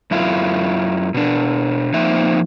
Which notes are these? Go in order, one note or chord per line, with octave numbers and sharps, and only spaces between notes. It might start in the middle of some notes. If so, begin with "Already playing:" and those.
F#2 E4 F4
B2 D4
F3 A#3 C4 D#4 E5